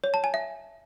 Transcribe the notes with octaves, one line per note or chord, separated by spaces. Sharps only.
C#5
A5
G#5
E5